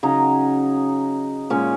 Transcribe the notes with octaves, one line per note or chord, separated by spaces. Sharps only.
C#3 F#3 D#4
A#2 G#3 C#4